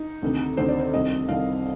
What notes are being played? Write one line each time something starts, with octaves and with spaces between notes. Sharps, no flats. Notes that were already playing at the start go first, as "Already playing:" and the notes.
Already playing: D#4
D2 C3 D#3
D2 C3 D#3 C5
D5
C5
C2 C3 D#3 D#5
C2 C3 D#3 F5